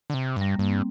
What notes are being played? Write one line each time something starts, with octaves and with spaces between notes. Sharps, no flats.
D3
C3
G2
G3
G2 A#3
C4